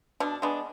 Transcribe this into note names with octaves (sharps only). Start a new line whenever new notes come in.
B2 D4
G#3 B3 D4